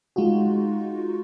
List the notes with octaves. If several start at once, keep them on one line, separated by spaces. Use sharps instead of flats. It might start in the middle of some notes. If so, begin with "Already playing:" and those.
G#3 D#4 F4 F#4